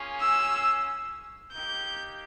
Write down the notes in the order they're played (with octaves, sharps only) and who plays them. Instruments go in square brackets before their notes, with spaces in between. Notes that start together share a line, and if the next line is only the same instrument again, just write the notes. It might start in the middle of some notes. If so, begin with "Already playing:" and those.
Already playing: [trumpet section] A#3 C#4 F4 G#4
[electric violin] E6
[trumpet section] A#3 D#4 G4 [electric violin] G6